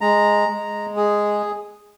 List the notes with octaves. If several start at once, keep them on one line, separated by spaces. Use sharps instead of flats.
G#3 A#5
G#3
G#4